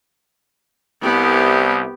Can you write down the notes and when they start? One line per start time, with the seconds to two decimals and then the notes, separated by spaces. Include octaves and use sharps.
1.02 C2 B3 G4